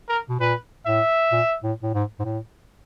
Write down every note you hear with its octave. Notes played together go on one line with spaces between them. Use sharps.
A#4
B2
A#2 B4
A2 E5
A#2
A2
A2
G#2
G#2
A2